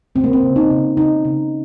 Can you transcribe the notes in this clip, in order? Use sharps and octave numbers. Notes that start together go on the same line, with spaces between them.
C#3 C4
A#3
C4
C#3
D#4
C#3
C#3 D#4
C#3